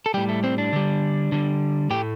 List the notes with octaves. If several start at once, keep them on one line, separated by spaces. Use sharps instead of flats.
A4
A2 G3 G4
A3
C4
D4
D3 G3
D3 G3
A2 A3 G4